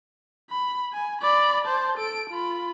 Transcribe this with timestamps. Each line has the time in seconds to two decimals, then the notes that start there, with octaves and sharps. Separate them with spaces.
0.50 B5
0.93 G#5
1.22 D5 B5
1.65 C5 A5
1.98 A4 D7
2.30 F4 B5